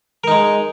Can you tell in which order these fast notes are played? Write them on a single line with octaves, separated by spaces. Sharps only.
A#4 D#4 G#3